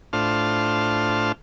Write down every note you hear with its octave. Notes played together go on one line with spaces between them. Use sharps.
A2 D4 F4 C5 A5 F6